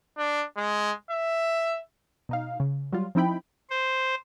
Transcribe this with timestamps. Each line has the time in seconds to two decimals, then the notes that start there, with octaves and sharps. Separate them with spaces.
0.18 D4
0.57 G#3
1.10 E5
2.29 B2 D#4 F5
2.60 C#3
2.92 F#3 G3 F4
3.15 F3 C4 D#4 E4 G5 B5
3.70 C5